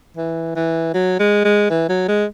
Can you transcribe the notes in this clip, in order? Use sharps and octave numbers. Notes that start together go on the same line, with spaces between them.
E3
E3
F#3
G#3
G#3
E3
F#3
G#3